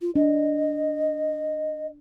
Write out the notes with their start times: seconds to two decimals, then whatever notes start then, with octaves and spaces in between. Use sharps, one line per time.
0.01 F4
0.15 D4 D#5